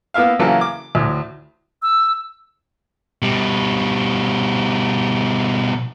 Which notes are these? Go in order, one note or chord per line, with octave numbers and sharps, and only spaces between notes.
A#3 B3 E4 E5 F5
C#3 E3 F#3 A#3 E4 A4
D6
D2 A2
E6
B2 G3